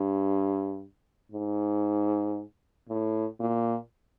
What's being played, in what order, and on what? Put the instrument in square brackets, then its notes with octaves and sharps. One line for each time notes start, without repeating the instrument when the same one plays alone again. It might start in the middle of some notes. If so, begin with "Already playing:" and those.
Already playing: [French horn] G2
G#2
A2
A#2